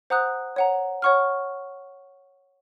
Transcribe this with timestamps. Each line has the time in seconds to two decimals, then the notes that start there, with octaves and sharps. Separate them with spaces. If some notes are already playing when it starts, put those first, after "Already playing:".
0.10 C5 F#5 A#5 D#6 F#6
0.56 C#5 F#5 A#5
1.02 C#5 F#5 C#6 F6